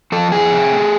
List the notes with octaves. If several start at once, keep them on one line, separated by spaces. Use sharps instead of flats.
F3 A4
F2 G#4
C3
A3